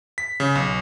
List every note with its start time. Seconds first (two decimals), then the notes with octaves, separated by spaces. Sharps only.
0.18 B6
0.40 C#3
0.55 B1